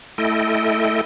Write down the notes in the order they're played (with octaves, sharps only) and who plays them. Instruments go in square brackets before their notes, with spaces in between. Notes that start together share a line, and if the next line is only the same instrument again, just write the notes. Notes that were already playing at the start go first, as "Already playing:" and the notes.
[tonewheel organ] A3 E4 A4 D#5 G5